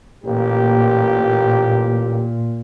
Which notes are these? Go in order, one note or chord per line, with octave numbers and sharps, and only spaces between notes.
A1 A#2 A#3 G4